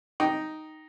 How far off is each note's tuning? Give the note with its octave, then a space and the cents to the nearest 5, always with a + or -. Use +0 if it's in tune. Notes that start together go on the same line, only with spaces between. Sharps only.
D#4 +0 G5 -10